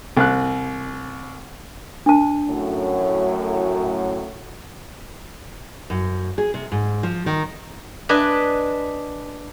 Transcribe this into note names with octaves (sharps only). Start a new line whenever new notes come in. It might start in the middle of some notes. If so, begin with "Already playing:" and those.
C2 F#6
D4 A5
F#2 A2 F#3
F#2
G#4
C3
G#2
F3
D#3
D4 B4 D#5 G#5